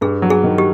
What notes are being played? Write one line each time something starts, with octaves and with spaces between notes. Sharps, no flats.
G2 G#4
F#3
G#4
D#3
G4